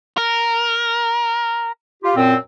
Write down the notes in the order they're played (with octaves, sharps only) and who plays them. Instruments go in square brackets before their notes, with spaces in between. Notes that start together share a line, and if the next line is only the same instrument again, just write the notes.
[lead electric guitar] A#4
[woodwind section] F4 G4
F#2 A#2 C4